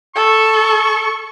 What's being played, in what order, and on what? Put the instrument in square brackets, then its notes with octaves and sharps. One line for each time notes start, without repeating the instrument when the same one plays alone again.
[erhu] A4 [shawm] C#6